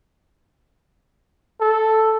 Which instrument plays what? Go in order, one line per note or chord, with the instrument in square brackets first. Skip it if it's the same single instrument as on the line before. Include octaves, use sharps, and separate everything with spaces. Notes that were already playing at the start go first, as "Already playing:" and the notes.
[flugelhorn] A4